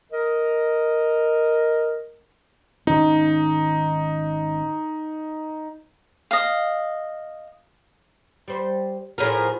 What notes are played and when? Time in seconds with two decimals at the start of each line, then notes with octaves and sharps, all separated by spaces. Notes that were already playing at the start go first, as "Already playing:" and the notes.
0.11 A#4 D#5
2.87 G#1 D#3 C#4 D#4
6.31 D#5 F5
8.48 G3 C5
9.18 A2 F3 F#4 G#4 A#4